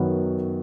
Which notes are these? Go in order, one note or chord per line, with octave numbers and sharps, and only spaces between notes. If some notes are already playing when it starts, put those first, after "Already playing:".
Already playing: F#2 D#3 F#3 B3